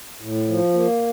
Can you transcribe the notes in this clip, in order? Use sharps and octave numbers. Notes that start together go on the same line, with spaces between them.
A2
F3
A#3